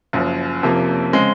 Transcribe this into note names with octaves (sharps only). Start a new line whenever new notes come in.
F#1 F#2 F3
F#1 F2 C3 F3 A#3
C#3 G#3 C4